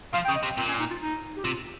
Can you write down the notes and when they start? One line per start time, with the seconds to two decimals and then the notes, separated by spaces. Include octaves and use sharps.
0.13 F3 F5
0.25 G5
0.29 C#3
0.35 D#5
0.43 C3
0.57 A#2 C4
0.69 C#4
0.79 D#4
0.90 F4
1.01 D#4
1.37 G4
1.44 C3 F4